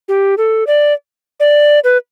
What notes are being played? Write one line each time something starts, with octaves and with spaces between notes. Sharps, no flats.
G4
A4
D5
D5
B4